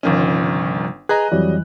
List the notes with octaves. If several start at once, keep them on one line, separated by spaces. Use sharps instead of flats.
G1 C2 D#3 F3 C#4 D#5
G#4 B4 D#5 G#5 A#5 F#6
F2 E3 F#3 G3